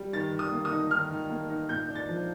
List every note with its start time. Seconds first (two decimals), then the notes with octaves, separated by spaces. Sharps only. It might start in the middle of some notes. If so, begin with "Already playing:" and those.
Already playing: G3
0.13 D#3 A6
0.33 D#3
0.39 D#6
0.52 A#3
0.65 D#6
0.71 D#4
0.91 D#3 F6
1.10 D#3
1.30 A#3
1.50 D#4
1.69 A#2 G6
1.89 D4
1.95 A6
2.08 F3